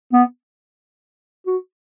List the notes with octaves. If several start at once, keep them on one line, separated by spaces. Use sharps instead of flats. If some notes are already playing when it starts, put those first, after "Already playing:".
B3
F#4